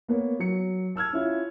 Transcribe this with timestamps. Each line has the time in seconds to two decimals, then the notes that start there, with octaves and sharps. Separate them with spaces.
0.08 A#3 B3 C#5
0.40 F#3 C#7
0.96 A5 E6 F6 G#6
1.13 C#4 E4 F4